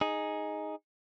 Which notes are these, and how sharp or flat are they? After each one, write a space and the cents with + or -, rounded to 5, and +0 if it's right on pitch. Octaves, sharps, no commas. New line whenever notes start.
D#4 +0 G#4 +0